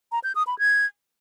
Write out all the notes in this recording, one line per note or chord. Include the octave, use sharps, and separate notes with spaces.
A#5
G6
D#6
B5
G#6